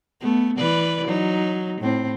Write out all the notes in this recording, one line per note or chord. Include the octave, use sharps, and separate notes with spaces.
A3 B3
E3 B4 D5
F#3 D#4
A2 C4